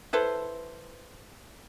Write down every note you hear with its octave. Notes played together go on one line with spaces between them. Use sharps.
E4 A4 B4 C5